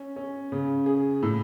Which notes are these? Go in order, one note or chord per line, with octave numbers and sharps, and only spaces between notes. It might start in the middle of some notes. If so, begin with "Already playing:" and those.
Already playing: C#4
C#4
C#3
G#4
A2